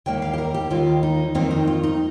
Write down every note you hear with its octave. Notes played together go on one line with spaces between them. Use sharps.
D#2 D#3 G3 A#3 G5
F5
G4
A#4
G4
D#2 D#3 G3 A#3 F4
D#4
F2 D#3 G3 A#3 C4
D#4
F4
D#4